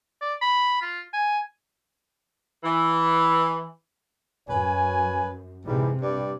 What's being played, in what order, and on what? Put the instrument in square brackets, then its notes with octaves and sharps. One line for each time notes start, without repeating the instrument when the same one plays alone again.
[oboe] D5
B5
F4
G#5
[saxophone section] E3
[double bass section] F#2 [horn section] B4 C#5 G#5
[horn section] G#2 E3 G3 [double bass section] C3
[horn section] G2 G3 D5